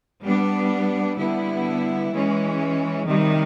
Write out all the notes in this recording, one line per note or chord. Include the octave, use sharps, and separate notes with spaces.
G3 B3 D4
D3 G3 B3 E4
E3 G#3 C#4
C3 D#3 G3